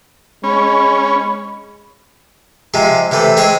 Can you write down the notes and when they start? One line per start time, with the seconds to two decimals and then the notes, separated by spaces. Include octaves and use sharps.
0.44 G#3 C#4 B5
2.74 C3 F3 G#3
3.11 C3 E3 A3
3.37 G#3 C4 G#4 C#5